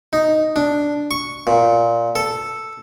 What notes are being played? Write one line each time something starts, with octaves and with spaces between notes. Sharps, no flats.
D#4
D4
C#6
A#2
A4